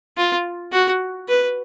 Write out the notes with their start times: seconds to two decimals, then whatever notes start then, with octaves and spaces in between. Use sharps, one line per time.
0.17 F4
0.72 F#4
1.28 B4